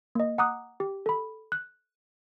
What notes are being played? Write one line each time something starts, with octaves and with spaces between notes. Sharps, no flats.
A#3 D#5
F#5 A#5 D6 D#6 F#6
G4
A4 B5
F#6